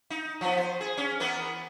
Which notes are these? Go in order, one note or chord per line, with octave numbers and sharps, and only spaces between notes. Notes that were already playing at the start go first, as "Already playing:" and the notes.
D#4
F3 B3
C5
G#4
C#4
E3 B3 A#4